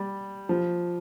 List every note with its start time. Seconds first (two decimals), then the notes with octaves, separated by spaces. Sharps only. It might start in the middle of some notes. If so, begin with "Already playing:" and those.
Already playing: G3
0.49 F3